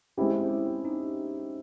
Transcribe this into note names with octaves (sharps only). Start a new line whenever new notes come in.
G#3 C4 C#4 E4 G4
D#4